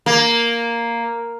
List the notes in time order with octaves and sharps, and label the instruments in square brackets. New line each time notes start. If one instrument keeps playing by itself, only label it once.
[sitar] A#3